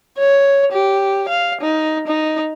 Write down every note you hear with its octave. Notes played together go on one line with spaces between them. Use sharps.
C#5
G4
F5
D#4
D#4